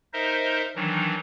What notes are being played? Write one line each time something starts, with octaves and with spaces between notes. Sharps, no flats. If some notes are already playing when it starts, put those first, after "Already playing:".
D#4 A#4 C5 D#5 E5
D#3 E3 F#3 D4 D#4